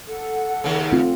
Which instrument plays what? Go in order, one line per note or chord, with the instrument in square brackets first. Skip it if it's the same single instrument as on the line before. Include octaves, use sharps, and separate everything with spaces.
[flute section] A4 F#5
[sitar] D#2 C#3
[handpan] A3 C4 F4